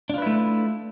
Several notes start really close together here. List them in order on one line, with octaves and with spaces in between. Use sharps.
D4 F4 B4 E4 A3